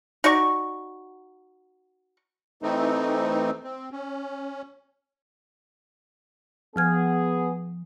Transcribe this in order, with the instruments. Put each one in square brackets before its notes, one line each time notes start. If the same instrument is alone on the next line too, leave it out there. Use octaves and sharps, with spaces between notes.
[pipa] D#4 F#4 D5 C#6
[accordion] E3 A3 C4 D#4
C4
C#4
[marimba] F3 F6 G#6 [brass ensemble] B3 G#4